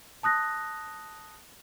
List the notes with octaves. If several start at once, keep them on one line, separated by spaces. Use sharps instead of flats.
A5 D#6 F#6 A#6